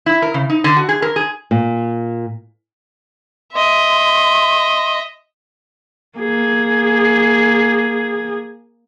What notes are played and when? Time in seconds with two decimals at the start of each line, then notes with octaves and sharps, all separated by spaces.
0.06 E4
0.22 A#4
0.34 C#3
0.50 D#4
0.64 D3
0.76 F#4
0.89 G#4
1.02 A#4
1.16 G#4
1.51 A#2
3.54 D#5 E5 C6
6.18 A#3 G#4